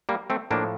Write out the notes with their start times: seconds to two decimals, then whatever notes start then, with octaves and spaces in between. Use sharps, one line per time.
0.09 G3 A#3
0.30 A3 C4
0.51 A2 F3 A#3 D4